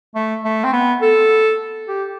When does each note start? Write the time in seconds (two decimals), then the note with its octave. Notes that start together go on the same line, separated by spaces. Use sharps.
0.15 A3
0.44 A3
0.64 C4
0.73 B3
1.02 A4
1.88 G4